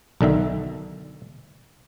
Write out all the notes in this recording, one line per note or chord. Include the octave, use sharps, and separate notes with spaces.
B1 D3 D#3 E5